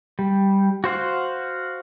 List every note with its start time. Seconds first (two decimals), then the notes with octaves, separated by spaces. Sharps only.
0.19 G3
0.84 F#4 C5 F5 F#5